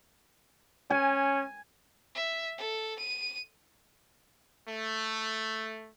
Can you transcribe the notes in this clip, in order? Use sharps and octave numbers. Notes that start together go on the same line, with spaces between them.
C#4 G#5
E5
A4
D#7
A3